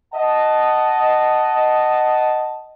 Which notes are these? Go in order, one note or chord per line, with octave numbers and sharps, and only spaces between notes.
D#5 F#5 A5